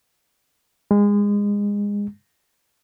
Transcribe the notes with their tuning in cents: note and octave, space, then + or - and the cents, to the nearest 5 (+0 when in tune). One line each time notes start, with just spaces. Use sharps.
G#3 -25